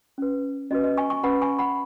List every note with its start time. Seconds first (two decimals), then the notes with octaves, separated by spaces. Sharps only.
0.18 C#4 B4
0.71 C#4 F#4 B4 D#5
0.84 D#5
0.97 G#5 C#6
1.10 G#5 C#6
1.24 C#4 B4 F#5 B5
1.42 G#5 C#6
1.59 F#5 B5